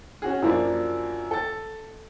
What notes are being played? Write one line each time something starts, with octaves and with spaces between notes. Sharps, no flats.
C#4 F#4 G#4
F#2 F3 A#3 D4
A4 A6